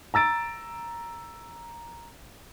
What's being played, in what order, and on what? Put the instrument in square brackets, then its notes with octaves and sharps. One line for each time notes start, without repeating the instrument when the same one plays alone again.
[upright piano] A#5 E6 A6 D7